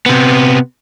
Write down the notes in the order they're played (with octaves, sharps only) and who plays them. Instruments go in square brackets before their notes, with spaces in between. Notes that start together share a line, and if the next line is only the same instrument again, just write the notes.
[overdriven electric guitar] C3 B3